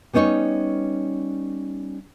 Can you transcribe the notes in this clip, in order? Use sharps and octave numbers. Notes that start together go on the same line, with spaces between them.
G3 B3 C#4 D#4 C#5